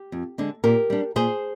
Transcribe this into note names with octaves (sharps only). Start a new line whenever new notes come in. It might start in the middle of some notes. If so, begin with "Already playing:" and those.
Already playing: G4
F2
D3 G#3 D4
A#2 G4 A#4
G3 D4
A#2 G#4 C5